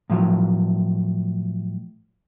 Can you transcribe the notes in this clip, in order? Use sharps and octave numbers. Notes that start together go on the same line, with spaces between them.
A2 F3 F#3